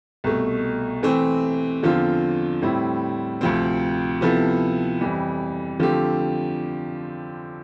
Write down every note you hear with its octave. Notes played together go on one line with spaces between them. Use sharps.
C2 B2 A3
E3 A3 C4
E2 D3 F3 C4 F4
A2 G3 C4 E4
D2 C3 F3 C4
C3 F3 B3 E4 A4
F2 E3 G3
D3 F3 A3 C4 G4